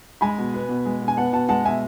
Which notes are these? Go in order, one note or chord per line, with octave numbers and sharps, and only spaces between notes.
G#3 G#5 B5
B2
B3
B2
G#3
B2
G#5
B3 F#5 A5
B2 F#5 A5
G#3 F#5 A5
B2 E5 G#5